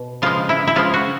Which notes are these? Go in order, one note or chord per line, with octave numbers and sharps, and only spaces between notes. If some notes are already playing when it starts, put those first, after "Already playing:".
Already playing: B2
C#3 F3 G#3 F4
E4
E4
C#3 F3 G#3 F4
F#4